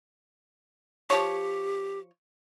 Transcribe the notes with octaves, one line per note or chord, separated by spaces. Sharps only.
F3 G4 C#5